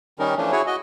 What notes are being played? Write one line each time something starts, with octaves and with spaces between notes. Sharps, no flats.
D#3 G3 C#4 D#4 A#4
E3 F3 A3 C#4 D4
E4 F#4 G#4 C#5
F#4 D#5